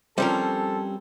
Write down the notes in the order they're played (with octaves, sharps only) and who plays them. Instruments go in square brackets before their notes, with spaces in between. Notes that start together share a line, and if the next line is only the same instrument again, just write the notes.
[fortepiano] F3 C5 [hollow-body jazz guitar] G3 C#4 A#4 [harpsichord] C4 [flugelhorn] A4